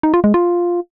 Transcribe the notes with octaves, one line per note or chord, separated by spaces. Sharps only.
D#4
F4
G#3
F4